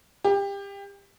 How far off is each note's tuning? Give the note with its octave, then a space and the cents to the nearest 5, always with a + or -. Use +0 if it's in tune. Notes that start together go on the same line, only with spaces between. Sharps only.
G4 +25